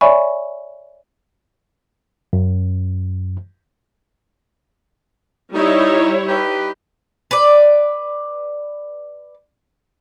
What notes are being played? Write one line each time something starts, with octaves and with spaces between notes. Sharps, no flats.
C#5 D5 E5 G#5 B5 C#6
F#2
G3 D#4 E4 C#5
D#4 G4 B4
B4 D5